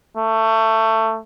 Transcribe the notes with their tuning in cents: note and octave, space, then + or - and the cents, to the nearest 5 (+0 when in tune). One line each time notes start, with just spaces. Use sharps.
A3 +20